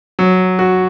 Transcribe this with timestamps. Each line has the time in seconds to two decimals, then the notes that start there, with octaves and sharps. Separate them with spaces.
0.19 F#3
0.59 F#4